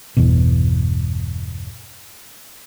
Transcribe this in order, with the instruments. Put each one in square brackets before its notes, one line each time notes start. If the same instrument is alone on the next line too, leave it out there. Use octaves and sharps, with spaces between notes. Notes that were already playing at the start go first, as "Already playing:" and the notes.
[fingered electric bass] G1 E2 B2